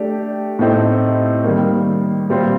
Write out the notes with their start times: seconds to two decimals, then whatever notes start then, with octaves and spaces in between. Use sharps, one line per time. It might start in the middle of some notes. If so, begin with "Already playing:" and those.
Already playing: A3 D4 G4
0.59 A2 A3 C4 D#4
1.44 D#3 G3 A#3
2.29 A#2 G3 C4 F4